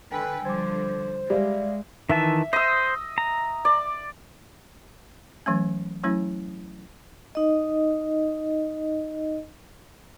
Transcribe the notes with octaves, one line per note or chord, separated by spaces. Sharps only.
D3 B4 G5 G#5 E6
D3 F3 G3 C5 D6 G#6
G3 G#3 D5 E5 F5
D#3 E3 E5 A5
C5 D#5 E6
A#5
D5
E3 F#3 A3 C#4
F#3 A3 C#4 E4
D#4 D#5